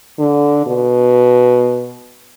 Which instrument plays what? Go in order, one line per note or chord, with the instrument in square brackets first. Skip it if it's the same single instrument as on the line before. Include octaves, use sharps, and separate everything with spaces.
[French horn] D3
B2